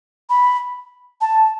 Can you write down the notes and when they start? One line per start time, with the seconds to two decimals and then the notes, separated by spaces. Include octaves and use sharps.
0.30 B5
1.21 A5